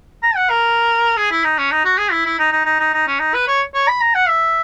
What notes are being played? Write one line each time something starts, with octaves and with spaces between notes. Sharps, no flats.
A#5
F#5
A#4
G#4
E4
D#4
C#4
D#4
F#4
G#4
E4
E4
D#4
D#4
D#4
D#4
D#4
C#4
D#4
B4
C#5
C#5
B5
A#5
F#5
E5